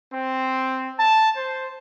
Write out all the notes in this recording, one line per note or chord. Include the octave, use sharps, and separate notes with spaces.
C4
A5
C5